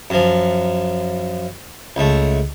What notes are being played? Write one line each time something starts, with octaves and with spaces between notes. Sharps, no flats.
F#2 F3
C#2 A3